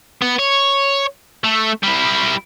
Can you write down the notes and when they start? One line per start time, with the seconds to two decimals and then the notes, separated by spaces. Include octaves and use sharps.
0.22 B3
0.39 C#5
1.44 A3
1.83 G3 E4